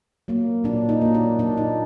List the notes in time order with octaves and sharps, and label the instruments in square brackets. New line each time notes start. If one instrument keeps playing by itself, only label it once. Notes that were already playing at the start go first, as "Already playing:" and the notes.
[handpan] F#3 A#3
A#2 D4
D#4
F#3 A#3
D4
A#2 D4
D#4